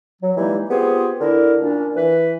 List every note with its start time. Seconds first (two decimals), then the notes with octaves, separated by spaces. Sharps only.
0.22 F#3
0.37 E3 G3 G#3 A#3 D#4 E4
0.70 B3 C4 F4 G4 G#4
1.20 D3 E4 A#4
1.62 A#2 C#4 D4
1.96 E3 B4